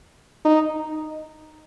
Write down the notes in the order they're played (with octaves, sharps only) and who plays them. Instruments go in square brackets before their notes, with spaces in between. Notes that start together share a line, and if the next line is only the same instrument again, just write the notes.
[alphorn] D#4